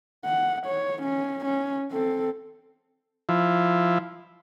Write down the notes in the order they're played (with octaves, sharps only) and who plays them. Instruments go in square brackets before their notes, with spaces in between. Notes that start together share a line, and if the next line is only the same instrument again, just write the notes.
[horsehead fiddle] F#5
C#5
C#4
C#4
C4 A4
[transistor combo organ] F3 E4